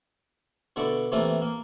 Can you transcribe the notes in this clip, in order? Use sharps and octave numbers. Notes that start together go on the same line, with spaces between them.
B2 D3 E4 D5 C#6
C3 E3 A3 A#3 A4
A#3